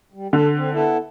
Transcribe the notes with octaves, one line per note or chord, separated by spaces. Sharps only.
G3
D3 A4
C4
B3 E4 A4